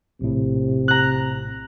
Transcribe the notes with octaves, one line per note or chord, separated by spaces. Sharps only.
A#1 A2 C3
A#5 F#6